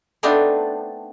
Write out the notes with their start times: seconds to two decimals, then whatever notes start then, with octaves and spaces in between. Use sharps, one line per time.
0.23 A3 B3 C4 D4 D#4